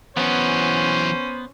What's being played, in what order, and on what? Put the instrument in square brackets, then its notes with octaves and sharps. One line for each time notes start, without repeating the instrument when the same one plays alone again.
[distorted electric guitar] E3 F#3 [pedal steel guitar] B3 [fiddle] C#4 [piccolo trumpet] C5